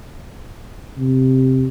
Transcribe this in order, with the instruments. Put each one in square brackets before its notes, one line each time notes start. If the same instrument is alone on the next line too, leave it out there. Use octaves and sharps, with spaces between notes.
[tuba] C3